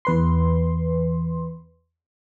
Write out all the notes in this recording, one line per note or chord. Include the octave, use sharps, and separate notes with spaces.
E2 B4 C6